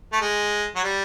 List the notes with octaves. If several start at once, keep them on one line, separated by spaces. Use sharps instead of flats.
A3
G#3
F#3
G3